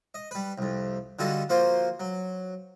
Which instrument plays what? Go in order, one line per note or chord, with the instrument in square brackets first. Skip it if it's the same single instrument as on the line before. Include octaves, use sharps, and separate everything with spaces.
[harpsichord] D#5
G3 B4
C2 F2
D3 G3 F4 F#4 A4 D#5
F3 A#3 F4 F#4 C5
F#3